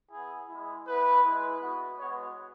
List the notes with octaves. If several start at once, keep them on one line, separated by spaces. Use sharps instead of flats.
B3 E4 G#4
G#3 E4
B3 E4 B4
G#3 E4
B3 F#4
G#3 B3 F#4 C#5